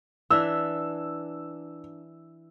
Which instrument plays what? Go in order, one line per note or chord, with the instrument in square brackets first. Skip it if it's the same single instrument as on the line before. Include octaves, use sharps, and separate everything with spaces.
[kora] E3 D4 E5 [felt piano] E6